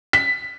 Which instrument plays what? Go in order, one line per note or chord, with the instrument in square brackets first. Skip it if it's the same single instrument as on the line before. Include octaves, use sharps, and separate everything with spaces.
[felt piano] B6